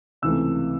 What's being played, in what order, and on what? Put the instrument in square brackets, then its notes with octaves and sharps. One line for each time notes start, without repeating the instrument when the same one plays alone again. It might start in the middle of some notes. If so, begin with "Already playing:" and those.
[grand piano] C#2 C3 E3 A3 E6